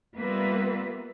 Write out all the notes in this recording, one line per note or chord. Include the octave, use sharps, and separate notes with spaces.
G3 A#3 B3 F4 B4 E5